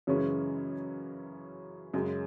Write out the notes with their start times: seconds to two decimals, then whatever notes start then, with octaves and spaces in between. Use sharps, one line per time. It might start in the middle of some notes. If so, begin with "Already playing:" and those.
0.07 F#2 C#3 E3 G#3 C#4
1.94 F#2 C#3 G#3